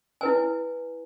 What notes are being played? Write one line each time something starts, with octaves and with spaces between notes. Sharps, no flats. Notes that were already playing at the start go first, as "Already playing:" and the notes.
E4 B4 G#5